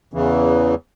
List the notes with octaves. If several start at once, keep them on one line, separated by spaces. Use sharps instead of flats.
E2 C#3 E3